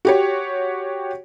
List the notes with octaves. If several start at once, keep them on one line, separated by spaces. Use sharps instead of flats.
F#4 G4 C#5